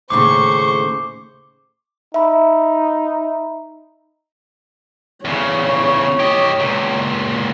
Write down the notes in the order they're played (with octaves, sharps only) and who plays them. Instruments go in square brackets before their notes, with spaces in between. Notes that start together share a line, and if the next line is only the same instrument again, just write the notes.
[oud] D#2 A2 C#3 [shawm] C5 [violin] C#6 [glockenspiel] D6
[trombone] D#4 [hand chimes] E5 B5
[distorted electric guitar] E2 C#3 [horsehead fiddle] C#5
[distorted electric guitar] G4 D#5
C#2 A#2